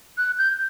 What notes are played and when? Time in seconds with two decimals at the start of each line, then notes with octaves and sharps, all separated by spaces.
0.18 F#6
0.38 G6